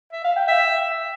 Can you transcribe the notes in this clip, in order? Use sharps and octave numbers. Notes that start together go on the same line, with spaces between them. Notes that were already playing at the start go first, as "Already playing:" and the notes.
E5
F5
G5
E5